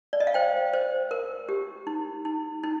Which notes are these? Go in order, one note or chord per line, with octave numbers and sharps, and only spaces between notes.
D5
D#5
F5
C5 G5
C5
A#4
G4
D#4
D#4
D#4